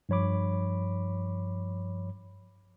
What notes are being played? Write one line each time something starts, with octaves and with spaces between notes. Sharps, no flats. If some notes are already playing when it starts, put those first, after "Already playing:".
G2 F3 C#5 B5 D6